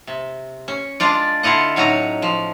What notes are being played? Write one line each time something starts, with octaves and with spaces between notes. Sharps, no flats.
C3
C#4
G#3 D4 F4 D5
D3 E4 F4 D#5 F#5
A2 F#3 C#4 D#4 A#5
F3